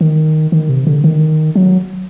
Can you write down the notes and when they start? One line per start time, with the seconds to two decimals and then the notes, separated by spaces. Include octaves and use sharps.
0.01 D#3
0.52 D#3
0.69 C3
0.87 D3
1.04 D#3
1.55 F#3